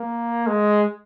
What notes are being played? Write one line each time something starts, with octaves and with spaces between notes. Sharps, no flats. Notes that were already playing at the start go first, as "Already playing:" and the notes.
Already playing: A#3
G#3